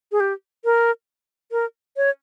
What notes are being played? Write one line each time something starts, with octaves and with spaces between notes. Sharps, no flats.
G#4
G4
A#4
A#4
C#5